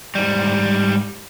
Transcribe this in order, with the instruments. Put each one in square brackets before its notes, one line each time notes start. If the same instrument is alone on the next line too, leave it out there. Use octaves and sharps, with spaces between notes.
[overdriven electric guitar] G#2 G3